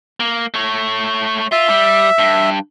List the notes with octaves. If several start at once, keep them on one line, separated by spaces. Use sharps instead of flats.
A#3
A3 C#5
F4 E5
G3
G2